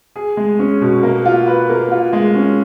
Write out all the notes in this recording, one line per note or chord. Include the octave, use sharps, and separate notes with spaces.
G#4
G#3
C#4
B2
A#3
F4
B4
A#3
F4
G#3
C#4